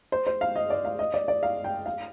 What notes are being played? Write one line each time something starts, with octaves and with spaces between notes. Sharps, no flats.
C5
C5
F5
D#5
D5
F5
D#5
D5
D5
F5
G5
F5